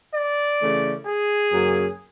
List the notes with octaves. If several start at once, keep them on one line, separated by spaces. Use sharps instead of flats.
D5
C#3 E3 A3
G#4
F#2 C#3 F#3 A#3